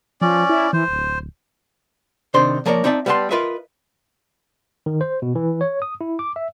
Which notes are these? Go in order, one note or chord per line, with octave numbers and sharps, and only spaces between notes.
F3 C#4 D5
E4
E3 C5
D1
C3 D#3 D4 C5 C6
F3 A#3 A#4 C#5 D5
C4 D#4 D5 E5 A5
G3 B3 B4 F5 A5 C6
F4 A#4 B4 D#5 E5
D#3
C5
B2
E3
C#5
D#6
E4
D6
E5